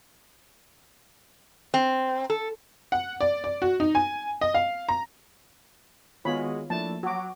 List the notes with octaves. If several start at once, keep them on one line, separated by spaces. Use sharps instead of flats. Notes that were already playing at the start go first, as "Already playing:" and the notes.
C4
A4
F#5
D5
D5
F#4
D#4
G#5
D#5
F5
A#5
D#3 G#3 B3 F4 F#4 G#4 C#5 B5
F3 A3 A#3 D4 E4 A5
F#3 F#4 D6